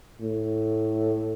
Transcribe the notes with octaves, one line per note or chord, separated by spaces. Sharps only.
A2